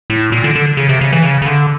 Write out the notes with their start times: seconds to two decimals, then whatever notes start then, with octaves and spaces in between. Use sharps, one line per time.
0.10 A2
0.32 A#2
0.44 D3
0.56 D3
0.77 C#3
0.89 C3
1.01 C#3
1.13 E3
1.23 C#3
1.42 C#3
1.46 D3